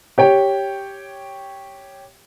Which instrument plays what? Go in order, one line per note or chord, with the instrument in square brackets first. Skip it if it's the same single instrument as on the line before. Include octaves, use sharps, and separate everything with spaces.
[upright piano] G4 C#5 G5